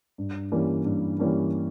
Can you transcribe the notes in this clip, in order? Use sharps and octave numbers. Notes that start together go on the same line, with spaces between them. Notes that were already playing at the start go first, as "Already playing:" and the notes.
G2
E3 G3 A#3 C#4
G2
E3 G3 A#3 C#4